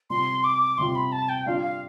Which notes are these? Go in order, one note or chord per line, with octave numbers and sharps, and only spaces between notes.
C3 G3 C4 F4 C6
D6
C3 G3 C4 F4 C6
B5
A5
G5
G3 D4 F4 F5
F5